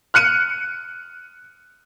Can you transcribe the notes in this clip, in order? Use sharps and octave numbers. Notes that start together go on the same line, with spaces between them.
F6 F#6 C#7 D#7